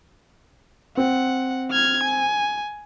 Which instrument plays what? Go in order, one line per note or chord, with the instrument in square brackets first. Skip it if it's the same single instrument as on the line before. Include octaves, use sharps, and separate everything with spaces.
[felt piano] C4 [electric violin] F#5
[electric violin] F6 G#6
G#5